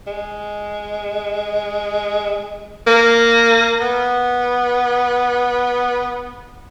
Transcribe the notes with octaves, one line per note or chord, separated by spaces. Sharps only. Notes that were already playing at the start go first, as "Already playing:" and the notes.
G#3
A#3
B3